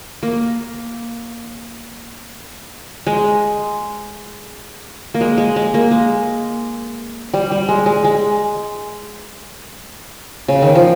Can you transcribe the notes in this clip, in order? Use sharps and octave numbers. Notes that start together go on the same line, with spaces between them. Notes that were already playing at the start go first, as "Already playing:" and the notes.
A#3
G#3
A#3
G#3
G#3
G#3
A#3
G#3
G3
G3
G#3
G#3
G#3
C#3
D#3
F3